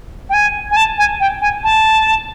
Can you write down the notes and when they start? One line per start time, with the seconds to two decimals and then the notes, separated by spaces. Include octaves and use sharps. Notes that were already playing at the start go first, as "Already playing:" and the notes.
0.30 G5
0.34 G#5
0.71 G#5
0.76 A5
0.98 G#5
1.20 G5
1.41 G#5
1.64 A5